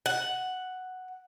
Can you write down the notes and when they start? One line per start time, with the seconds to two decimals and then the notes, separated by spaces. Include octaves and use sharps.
0.06 F#5